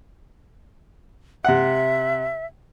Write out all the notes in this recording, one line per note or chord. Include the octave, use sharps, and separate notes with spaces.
C3 E5 F#5